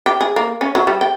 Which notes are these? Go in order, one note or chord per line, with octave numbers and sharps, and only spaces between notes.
G4
G#4
A#3
C#4
F#3
G3
G5